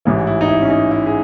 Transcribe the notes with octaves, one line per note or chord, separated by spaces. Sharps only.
A1 G#2 E3 E4
E4
D#4
E4
C#4
D#4
E4
G#4